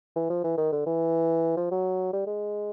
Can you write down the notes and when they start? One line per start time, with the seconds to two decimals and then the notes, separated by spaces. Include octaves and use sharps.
0.16 E3
0.30 F3
0.44 E3
0.58 D#3
0.73 D3
0.86 E3
1.57 F3
1.71 F#3
2.13 G3
2.27 G#3